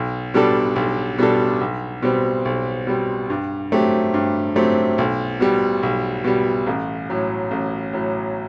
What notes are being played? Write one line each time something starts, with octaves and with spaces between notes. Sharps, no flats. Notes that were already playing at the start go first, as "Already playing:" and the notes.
Already playing: B1
B2 G3 D4 A4
B1
B2 G3 D4 A4
B1
B2 G3 C4
B1
B2 G3 C4
G2
F#3 A3 C4 G4
G2
F#3 A3 C4 G4
B1
B2 G3
B1
B2 G3
A1
A2 F#3
A1
A2 F#3